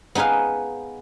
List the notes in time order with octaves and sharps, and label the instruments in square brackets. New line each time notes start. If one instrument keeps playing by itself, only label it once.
[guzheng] B3 D#4 G#4 B4 F5